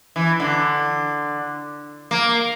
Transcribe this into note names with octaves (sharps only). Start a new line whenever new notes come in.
E3
D3
A#3